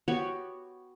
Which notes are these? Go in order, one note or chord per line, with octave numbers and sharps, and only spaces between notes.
B3 F#4 G4 C#5